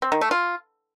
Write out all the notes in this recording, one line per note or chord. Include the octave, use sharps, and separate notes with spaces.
C4
D#3
A3
F4